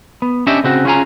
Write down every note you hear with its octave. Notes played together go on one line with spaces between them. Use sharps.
B3
C#4 D4 G4 D#5 E5
C#3 C4 F#4
C#4 F4 G#4 G#5 A#5